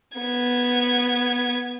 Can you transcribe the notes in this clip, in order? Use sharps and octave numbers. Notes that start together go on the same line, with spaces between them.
B3 G#6